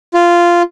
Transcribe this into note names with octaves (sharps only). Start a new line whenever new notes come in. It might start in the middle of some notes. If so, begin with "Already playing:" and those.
F4